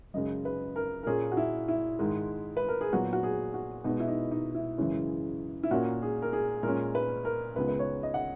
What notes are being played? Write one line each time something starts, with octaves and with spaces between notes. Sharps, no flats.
F#2 C#3 G#3 D#5
B4
A#4
A#4
A#2 A#3 C#4 G#4
F#4
E4
E4
G#2 D#3 G#3
B4
A#4
G#4
A#2 F#3 B3 F#4
F#4
G#4
F#4
B2 G#3 B3 D#4
E4
D#4
D#4
E4
F#2 C#3 E3 G#3 C#4
E4
A#2 A#3 C#4 F#4
G#4
A#4
G#4
A#2 G#3 C#4 A#4
B4
A#4
C#2 C#3 G#3 B3 B4
B4
C#5
D#5
F#5